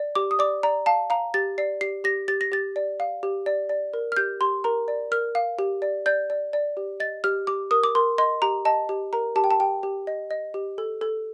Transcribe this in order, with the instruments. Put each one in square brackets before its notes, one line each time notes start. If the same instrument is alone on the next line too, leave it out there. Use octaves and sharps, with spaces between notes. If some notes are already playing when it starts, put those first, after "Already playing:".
Already playing: [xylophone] D5
G4 D6
D#6
D5 D6
D5 A#5
F5 A5
F5 A#5
G4 A6
D5 C7
G4 C7
G4 A#6
G4 A6
A#6
G4 A6
D5
F5
G4
D5
D5
A#4
F6
G4 G6
G4 C6
A#4 A#5
D5
A#4 F6
F5
G4
D5
D5 G6
D5
D5
G4
D#5 A6
G4 F6
G4 D6
A#4 D#6
D6
A#4 C6
D#5 C6
G4 A#5
D#5 A5
G4
A#4 A#5
G4 A5
G5
A5
G4 G5
G4
D#5
D#5
G4
A4
A4